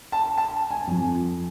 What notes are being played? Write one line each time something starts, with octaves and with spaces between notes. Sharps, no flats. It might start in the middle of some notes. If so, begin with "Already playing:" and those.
A5
A5
G#5
F2 F3